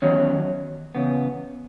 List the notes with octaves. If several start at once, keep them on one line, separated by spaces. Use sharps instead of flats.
E2 D#3 F#3 C#4
E2 C#3 B3